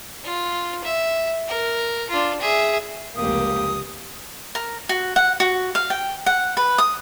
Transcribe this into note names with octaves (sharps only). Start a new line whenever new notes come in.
F4
E5
A#4
D4 F4
G#4 E5
F1 C#2 A#3 G4 D#6
A#4
F#4
F#5
F#4
F5
G5
F#5
B4
D#6